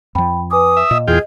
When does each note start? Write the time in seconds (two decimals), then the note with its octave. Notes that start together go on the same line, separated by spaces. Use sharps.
0.15 F2 F3 G5 B5
0.51 B4 G#5 D6 D#6
0.77 E5
0.91 A#2 D#5
1.08 E2 F4 G#4 G5